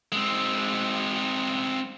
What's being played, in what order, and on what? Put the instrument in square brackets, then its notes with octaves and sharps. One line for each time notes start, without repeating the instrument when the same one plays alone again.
[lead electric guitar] G#3 C4